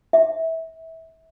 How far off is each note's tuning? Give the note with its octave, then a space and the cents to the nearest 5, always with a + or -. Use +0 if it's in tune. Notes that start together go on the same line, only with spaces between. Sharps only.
E5 -25